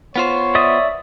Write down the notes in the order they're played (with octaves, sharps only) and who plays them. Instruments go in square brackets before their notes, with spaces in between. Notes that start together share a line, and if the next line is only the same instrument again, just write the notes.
[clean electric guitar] B3 F4 C5 [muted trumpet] C#5
[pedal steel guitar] D5 E5 D#6